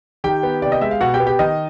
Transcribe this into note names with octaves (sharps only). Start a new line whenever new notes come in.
D#3 G4 G5
B3
C3 D5
D#5
G#3 E5
F5
B2 F#4 F#5
G4 G5
B3
G4 G5
D#3 D#4 D#5